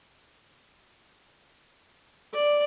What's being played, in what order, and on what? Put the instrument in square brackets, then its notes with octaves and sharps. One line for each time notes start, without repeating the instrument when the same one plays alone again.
[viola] D5